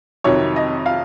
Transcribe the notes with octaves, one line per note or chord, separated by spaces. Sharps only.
F2 C3 D#3 F#3 C#5
D#5
F5